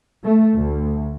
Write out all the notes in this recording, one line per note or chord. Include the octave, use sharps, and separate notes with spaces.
A3
D2